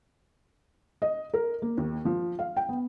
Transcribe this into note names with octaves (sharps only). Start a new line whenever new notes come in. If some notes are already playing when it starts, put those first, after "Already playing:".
D#5
A#4
A#3
D#2
F3
F5
G5
B3